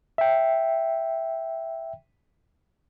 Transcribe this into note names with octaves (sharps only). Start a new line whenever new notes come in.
E5 G5